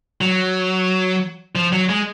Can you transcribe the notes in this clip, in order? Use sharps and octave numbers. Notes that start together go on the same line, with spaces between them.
F#3
F3
F#3
G#3